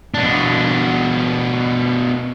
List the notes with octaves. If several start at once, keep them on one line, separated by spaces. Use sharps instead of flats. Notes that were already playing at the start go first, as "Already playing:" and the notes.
B2 D4